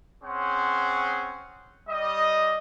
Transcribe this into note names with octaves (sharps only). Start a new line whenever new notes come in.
C4 C#4 G#4 C5 F#5
G3 D#5